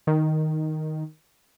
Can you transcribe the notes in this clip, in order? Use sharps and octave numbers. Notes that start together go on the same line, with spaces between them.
D#3